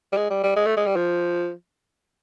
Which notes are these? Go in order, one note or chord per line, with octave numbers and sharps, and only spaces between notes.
G3
G#3
G3
G3
G#3
A3
G#3
G3
F3